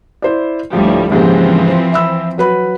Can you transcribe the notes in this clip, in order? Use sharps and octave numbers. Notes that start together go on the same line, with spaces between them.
E4 C5 D5
D2 A2 F3 G3
D#2 G#2 C#3 E3 F3 C4
E5 B5 E6
F#3 B4 B5